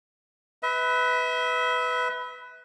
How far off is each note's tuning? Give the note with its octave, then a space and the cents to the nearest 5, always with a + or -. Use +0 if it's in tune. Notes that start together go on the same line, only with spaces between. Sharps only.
B4 +10 E5 -40